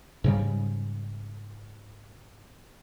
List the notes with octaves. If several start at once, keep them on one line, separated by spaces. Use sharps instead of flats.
G#2 C#3 G3